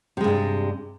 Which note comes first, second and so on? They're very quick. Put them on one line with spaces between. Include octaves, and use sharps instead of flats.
C3 G#3 G2 G3